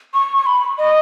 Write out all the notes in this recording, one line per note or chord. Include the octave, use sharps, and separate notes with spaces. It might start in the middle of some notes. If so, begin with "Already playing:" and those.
C#6
C#6
B5
D#5